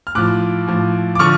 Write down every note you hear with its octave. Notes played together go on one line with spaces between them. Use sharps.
F6
A2 F3 D6 F#6
A2 F3
D6
D3 F3 C#6 F6